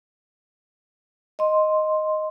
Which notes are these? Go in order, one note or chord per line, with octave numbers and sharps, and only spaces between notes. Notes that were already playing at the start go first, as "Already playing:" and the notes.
D#5 C6